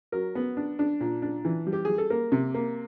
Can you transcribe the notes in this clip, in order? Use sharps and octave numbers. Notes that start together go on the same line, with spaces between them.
F#3 A#4
B3
D4
D4
A#2
D4
E3
G3
G4
G3 G#4
A4
A#3 A#4
C3
A#3